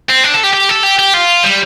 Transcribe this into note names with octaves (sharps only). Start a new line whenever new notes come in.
C4
D4
A4
G4
G4
A4
G4
G4
F4
G3